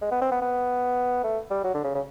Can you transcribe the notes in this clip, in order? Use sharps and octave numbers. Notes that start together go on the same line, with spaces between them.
G#3
B3
C4
B3
B3
A3
G3
F#3
D3
C#3
C#3